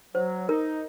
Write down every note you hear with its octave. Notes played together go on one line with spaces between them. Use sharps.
F#3 C5
D#4 A#4